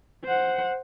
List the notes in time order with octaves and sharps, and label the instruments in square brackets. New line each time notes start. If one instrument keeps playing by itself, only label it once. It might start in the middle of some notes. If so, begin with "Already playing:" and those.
[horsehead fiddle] C5 F#5